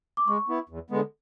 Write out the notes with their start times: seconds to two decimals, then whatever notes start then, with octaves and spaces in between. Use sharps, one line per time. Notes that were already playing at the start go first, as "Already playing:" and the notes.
0.17 D6
0.28 G#3 C#6
0.49 B3 E4
0.69 E2
0.90 D3 G#3 B3